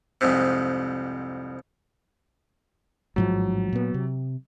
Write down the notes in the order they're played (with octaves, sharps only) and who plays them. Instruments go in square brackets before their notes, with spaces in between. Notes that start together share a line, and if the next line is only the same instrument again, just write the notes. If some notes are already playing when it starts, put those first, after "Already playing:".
[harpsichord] C2 F2 G#2 C3
[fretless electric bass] A1 G#2 F3 [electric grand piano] F#3
[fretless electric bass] A#2 B3
C3